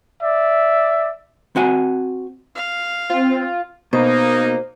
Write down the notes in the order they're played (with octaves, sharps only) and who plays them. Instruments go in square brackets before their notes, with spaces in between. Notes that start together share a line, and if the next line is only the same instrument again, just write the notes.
[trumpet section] D5 E5
[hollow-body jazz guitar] C4 F#4 G#5
[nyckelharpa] F5
[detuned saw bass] C4 [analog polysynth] F4
[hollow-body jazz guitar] B2 [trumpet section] A#3 D#4 [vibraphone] C5